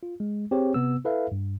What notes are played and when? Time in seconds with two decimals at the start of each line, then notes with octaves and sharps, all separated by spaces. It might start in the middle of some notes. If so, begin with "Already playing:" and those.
0.03 F4
0.20 G#3
0.51 C4 G4 G#4 C#5
0.74 C3 B3 E6
1.05 E4 A4 B4 E5 F5
1.32 G2